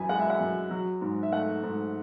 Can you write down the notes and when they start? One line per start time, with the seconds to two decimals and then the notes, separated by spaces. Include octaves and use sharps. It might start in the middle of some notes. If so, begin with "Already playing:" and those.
Already playing: F#2 E3 G#5 B5
0.09 G#3 F#5
0.19 E5
0.30 F#5
0.40 F#2
0.71 F#3
1.01 G#2
1.23 E5
1.32 A3 F#5
1.63 G#2